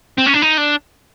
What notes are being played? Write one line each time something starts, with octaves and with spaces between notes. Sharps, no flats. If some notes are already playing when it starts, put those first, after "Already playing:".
C4
C#4
D4
D#4
D4